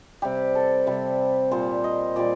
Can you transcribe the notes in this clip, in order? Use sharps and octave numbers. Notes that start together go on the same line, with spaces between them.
C3 G3 G4
A4
C3 G3
A#2 G3 C5
D#5
A#2 G3 D5